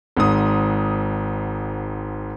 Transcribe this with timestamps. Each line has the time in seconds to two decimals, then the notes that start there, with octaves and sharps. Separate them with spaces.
0.17 G#1 G#2 D#6